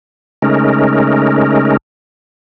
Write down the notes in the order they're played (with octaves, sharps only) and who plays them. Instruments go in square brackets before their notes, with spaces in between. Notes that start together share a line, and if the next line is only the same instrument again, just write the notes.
[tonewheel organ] C#3 G#3 A3 C#4 D#4 A#4